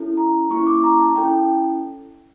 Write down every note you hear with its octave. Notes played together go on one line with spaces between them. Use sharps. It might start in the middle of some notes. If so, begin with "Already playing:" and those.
Already playing: C#4 E4 A4
A#5
A#3 C#4 E4 C#6
D6
A#5
A5
C#4 E4 A4 G5